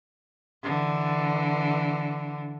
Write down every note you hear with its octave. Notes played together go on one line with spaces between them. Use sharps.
D3 E3